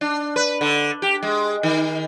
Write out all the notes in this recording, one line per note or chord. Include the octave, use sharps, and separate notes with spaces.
D4
B4
D3
G4
G#3
D#3